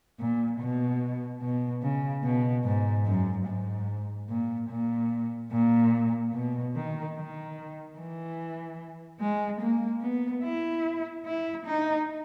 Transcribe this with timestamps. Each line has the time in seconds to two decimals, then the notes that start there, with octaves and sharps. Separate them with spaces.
0.20 A#2
0.60 B2
1.42 B2
1.83 C#3
2.23 B2
2.64 G#2
3.06 F#2
3.46 G#2
4.29 A#2
4.70 A#2
5.52 A#2
6.33 B2
6.75 D#3
7.16 D#3
7.98 E3
9.20 G#3
9.61 A#3
10.02 B3
10.43 E4
11.26 E4
11.66 D#4